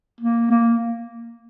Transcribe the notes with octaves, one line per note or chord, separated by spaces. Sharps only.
A#3
A#3